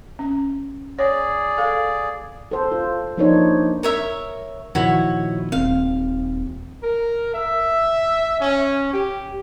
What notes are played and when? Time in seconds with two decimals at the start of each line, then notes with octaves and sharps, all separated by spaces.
0.19 C#4
0.99 G#4 C#5 D5
1.58 A4 F5
2.51 A4 C5
2.72 F4
3.17 F3 A#3 D4 D#4 C5 C#5
3.83 A#4 C#5 E5
4.75 A#2 D#3 F3 E4 F#4 C#5
5.52 D#1 C4 F5
6.83 A#4
7.34 E5
8.41 C#4
8.93 G4